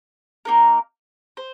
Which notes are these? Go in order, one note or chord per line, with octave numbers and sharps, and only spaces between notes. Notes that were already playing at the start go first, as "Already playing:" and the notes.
A#3 D#4 A#4
C5